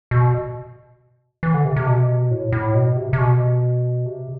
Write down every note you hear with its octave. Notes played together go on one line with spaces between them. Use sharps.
B2
E3
D3
C3
C3
B2
A2
A2
B2
C3
C3
B2
C3